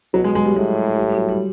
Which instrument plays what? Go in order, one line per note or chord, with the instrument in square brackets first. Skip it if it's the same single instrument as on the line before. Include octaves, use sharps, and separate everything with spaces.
[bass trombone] B2 [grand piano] F#3
[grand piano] G#3
G#3
G3
[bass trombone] A2 [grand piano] G#3
[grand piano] G3
G3
F#3
G3